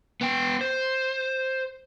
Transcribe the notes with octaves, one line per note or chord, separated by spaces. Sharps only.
B3 G5
C5